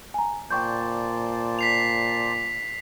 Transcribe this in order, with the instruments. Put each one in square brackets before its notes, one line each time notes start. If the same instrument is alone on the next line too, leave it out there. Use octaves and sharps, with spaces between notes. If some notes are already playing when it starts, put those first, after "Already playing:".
[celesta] G#5 A#5
[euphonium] A#2 [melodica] C5 D5 A5 [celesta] G5 C#6 G6
[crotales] B6 C7 F7